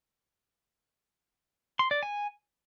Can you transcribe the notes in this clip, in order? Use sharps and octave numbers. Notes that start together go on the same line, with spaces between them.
C6
D5
G#5